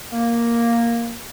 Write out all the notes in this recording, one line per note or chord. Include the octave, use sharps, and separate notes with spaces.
A#3